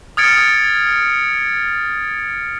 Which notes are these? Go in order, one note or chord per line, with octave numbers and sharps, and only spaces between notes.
D#6 F6 G#6 A6 C#7 D7